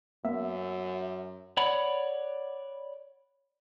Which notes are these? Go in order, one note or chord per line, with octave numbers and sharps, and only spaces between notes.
F#2 A#3 B3 E5
C#5 D5 F#5 B5